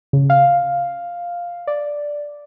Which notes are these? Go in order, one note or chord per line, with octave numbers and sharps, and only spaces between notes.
C#3
F5
D5